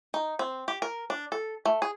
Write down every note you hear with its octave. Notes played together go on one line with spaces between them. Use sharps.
D#4
C4
G4
A#4
D4
A4
A3
G#4